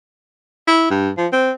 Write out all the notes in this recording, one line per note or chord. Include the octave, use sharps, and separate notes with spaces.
E4
G2
F3
C4